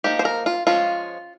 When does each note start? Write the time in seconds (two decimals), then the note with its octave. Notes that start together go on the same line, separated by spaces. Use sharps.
0.04 F3 A#3 D#4 G4
0.19 C5
0.25 A#4
0.46 F4
0.67 F3 G#3 C#4 F4